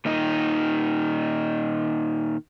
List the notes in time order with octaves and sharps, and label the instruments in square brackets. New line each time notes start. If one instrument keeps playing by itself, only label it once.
[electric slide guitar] A#2 D#3 D#4